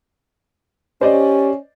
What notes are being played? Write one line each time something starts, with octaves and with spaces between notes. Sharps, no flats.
C#4 G4 C5 D5 D#5